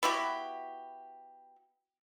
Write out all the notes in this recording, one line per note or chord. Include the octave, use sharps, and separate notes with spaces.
B3 E4 F#4 G4